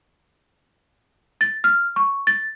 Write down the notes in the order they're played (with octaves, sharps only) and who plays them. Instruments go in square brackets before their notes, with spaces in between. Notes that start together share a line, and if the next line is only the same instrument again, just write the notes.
[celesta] A6
F6
C#6
A6